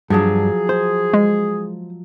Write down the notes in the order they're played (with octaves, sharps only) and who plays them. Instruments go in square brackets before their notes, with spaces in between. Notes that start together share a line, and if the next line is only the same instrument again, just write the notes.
[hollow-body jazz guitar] G2 D4 [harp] F3 F#3 [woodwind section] G#4
[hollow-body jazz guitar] C5
[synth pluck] G#3